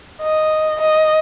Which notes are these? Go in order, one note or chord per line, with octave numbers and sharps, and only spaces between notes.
D#5
D#5